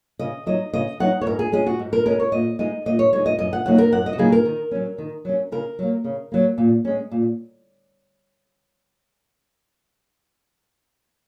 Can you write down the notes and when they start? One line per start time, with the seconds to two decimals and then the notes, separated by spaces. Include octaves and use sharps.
0.19 C#3 D#5
0.46 F#3 D#4 D#5
0.73 C#3 D#5
1.00 F#3 D#4 F#5
1.21 C#5
1.26 G#2 A#4
1.39 G#4
1.52 G#3 C#4 G#4
1.66 F#4
1.79 G#2
1.93 A#4
2.06 G#3 C#4 A#4
2.20 C#5
2.32 A#2 D#5
2.59 G#3 D#4 D#5
2.86 A#2 D#5
2.99 C#5
3.12 G#3 D#4 C#5
3.26 D#5
3.39 F#2 D#5
3.53 F#5
3.65 C#3 F#3 A#3 D#4 F#5
3.78 A#4
3.92 F#2 F#5
4.06 D#5
4.13 F#4
4.18 C#3 F#3 A#3 D#4 G#4
4.32 A#4
4.45 D#3
4.71 F#3 C#4
4.98 D#3
5.25 F#3 C#4
5.52 C#3 A#4
5.79 F#3 A#3
6.04 C#3
6.32 F#3 A#3
6.58 A#2
6.85 G#3 C#4
7.11 A#2